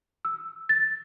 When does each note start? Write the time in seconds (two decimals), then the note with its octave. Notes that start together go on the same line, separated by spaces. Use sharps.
0.25 E6
0.69 A6